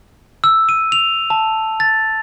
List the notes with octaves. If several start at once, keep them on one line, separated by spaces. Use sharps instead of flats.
E6
D#7
F7
A5
A6